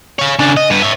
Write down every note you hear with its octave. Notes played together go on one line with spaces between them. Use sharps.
C#5 F5
C#3 D4
D#5
G2 B3
C#5 E5